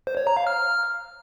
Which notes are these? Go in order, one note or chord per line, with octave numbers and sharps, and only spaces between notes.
C5
C#5
A#5
F5
F6